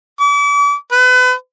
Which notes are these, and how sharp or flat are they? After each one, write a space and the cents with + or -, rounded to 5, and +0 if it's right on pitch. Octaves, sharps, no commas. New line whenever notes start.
D6 -40
B4 +35